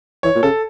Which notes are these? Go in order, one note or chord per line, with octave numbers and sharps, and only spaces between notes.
E3 C#5
A#2
C#3 A4